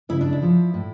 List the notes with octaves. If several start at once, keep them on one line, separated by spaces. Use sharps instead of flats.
C#3 E4
D4
E4
F3
A2